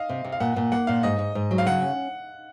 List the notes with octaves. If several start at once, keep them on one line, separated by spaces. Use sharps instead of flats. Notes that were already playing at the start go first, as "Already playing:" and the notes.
Already playing: D#5 F5
C3
C3
F5
A#2 F#5
A#2
A#3 F#5
A#2 F5
G#2 D#5
G#2
G#2
F#3
F5
C#3 F#5
C#4